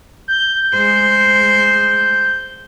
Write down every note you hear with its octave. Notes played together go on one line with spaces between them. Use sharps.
G6
G#3 C5